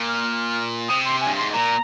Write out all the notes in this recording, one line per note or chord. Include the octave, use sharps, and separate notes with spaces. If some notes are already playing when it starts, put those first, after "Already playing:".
Already playing: A#2
F6
C3 D#6
C6
G#5
G2
G#2 C6
A#2 A#5